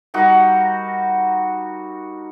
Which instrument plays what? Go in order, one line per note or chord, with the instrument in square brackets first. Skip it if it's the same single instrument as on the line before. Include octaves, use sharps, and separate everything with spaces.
[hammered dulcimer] G3 D#4 F#4 A#4